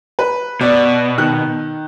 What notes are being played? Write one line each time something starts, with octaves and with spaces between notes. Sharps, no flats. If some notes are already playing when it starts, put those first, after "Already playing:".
B4
B2 D5
D#3 F#6